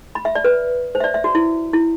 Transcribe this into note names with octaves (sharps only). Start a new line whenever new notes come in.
B5
E5
D5
B4
C5
E5
D5
E5
F#4
E4
E4